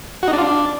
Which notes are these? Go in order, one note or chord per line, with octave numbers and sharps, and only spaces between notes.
F#4
D#4
D4
F4
D4